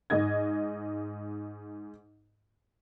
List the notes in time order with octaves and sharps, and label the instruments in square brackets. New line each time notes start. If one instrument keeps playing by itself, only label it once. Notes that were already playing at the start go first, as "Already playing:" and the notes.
[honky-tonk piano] G#2 D#5 G#6